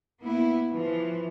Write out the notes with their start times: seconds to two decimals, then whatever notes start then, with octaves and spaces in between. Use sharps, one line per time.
0.23 A#3 B3 E4
0.73 E3 F3